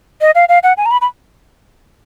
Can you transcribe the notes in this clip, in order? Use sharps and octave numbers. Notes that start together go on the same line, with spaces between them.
D#5
F5
F5
F#5
G#5
A#5
B5
B5